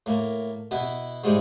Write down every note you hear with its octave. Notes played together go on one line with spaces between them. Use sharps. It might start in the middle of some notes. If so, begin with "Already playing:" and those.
A2 A#3
B2 B3 E4
G#2 E3 G3 G#3